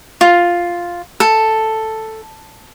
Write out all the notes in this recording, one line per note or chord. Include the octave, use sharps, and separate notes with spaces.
F4
A4